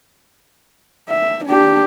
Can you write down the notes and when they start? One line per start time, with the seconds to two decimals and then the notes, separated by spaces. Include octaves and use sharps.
1.09 E5
1.45 D4 G4